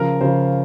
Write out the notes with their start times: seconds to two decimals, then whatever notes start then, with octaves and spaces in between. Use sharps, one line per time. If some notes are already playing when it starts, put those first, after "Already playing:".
Already playing: C#3 F3 A#4
0.21 C#3 F3 C5